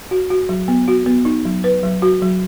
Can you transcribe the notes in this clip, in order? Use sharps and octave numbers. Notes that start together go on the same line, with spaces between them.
F#4
F#4
F#3
B3
F#4
B3
D#4
F#3
B4
F#3
F#4
F#3